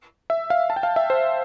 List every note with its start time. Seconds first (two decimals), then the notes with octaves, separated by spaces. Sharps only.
0.30 E5
0.50 F5
0.70 A5
0.76 G5
0.83 F5
0.96 E5
1.10 C5